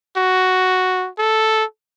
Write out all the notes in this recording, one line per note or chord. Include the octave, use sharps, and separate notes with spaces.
F#4
A4